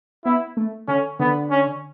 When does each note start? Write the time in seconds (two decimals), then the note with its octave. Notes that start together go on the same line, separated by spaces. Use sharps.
0.25 B3 E4
0.57 A3
0.88 D3 C#4
1.20 D3 B3
1.51 C#4